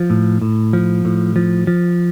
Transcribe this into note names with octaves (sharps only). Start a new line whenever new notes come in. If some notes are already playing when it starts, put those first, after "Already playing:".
Already playing: F3
A2
A2
F3
A2
F3
F3